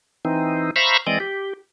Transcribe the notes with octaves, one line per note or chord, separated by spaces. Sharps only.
E3 C4 D#4
C5 E5 F5 A#5 B5 C#6
E3 G#3 C4 D5 D#5
G4